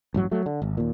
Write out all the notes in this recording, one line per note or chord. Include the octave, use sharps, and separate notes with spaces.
A1 G2 F#3
F#3 A3
D3
G#1
D#2 A#2